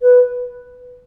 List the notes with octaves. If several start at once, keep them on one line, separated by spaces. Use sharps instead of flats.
B4